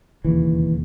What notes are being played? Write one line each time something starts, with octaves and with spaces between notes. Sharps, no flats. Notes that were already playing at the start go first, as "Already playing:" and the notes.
E1 D#2 C#3 E3